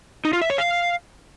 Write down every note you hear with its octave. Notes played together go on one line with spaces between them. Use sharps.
D#4
F4
E5
C#5
F5